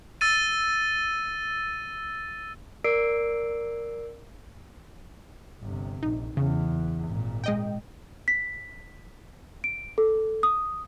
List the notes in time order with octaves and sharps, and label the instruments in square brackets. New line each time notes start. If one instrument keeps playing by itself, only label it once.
[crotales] E6 A6 D#7
[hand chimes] A#4 D5 E6 C7 D7
[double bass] G1 C3
[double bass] A#1 [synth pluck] D#4
[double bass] E2 [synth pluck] C#3
[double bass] G#1 A#2
[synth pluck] G#3 D#5 G5
[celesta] B6
D7
A4
D#6